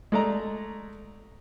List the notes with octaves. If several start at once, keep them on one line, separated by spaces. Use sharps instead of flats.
G#3 A3 D5 A#5